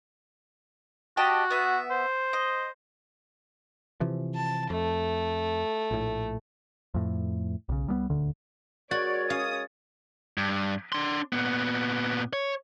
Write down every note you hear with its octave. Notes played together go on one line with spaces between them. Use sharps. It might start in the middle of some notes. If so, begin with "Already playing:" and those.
F#4 G4 D#5 A5
B3 E5
C5
D#5
C3 E3 F3
A5
F2 A3
A#1 A2
F2 A2
B1 C#3
C2 G3 G#3 B3
D#1 D2 D3
G#3 F#4 A#4 C#5 D5 A6
C#4 F5 D#6
G2
D4 C6
A#2 B3
C#5